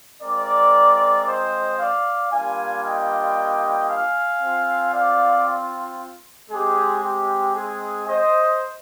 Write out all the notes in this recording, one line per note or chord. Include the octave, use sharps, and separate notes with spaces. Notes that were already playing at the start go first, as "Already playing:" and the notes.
G#3 C4 F4 A#4 D5
C5 D#5
D5 F5
G3 A#3 D4 F4 F5 G#5
D#5 G5
F5 G#5
C4 F4
D5 F5
G#3 C4 G4 G#4
G4
G#4
C5 D#5